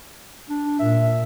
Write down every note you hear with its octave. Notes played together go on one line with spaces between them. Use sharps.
D4
A#2 E5